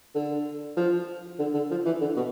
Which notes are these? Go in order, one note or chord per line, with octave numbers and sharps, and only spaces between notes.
D3
F3
D3
D3
F3
E3
D3
B2